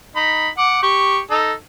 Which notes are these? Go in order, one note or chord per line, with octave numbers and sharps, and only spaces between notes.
D#4 B5
F#5 D6
G4 C#6
D#4 A4